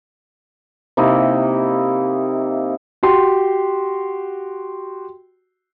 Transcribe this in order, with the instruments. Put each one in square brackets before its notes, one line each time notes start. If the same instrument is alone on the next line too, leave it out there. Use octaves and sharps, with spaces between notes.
[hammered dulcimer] C3 A#3 D#4 E4
[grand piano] F#4 G4 C6